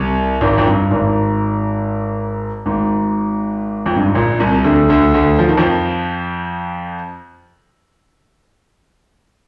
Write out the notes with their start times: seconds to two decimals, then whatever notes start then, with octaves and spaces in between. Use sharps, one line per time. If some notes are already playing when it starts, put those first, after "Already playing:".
Already playing: C2 C3
0.41 G#1 G#2
0.58 F2
0.66 G2
0.91 G#1 G#2
2.66 G#1 G#2
3.86 F2
3.96 G2
4.06 G#2
4.15 A#1 A#2
4.39 C2 C3
4.64 D2 D3
4.88 D2 D3
5.14 D2 D3
5.39 F3
5.49 D#3
5.57 F2 F3